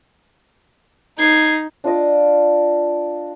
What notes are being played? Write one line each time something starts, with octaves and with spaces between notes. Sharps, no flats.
D#4 G#6 C7
D4 F4 D5 D#5